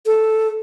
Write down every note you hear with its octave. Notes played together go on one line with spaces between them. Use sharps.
A4